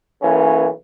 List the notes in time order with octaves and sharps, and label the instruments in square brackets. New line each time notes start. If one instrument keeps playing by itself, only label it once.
[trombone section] B1 E3 A#3 C#4